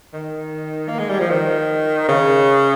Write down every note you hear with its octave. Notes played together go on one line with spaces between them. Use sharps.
D#3
A#3
G#3
G3
F3
D#3
C#3